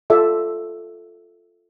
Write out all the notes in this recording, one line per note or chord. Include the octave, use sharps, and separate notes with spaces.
F4 A4 D5 E5